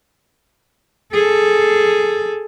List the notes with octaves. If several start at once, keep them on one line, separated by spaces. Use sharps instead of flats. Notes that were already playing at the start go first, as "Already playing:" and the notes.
G#4 A4